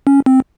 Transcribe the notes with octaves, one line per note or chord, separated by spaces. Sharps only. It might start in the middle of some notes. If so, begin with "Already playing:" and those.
C#4
C4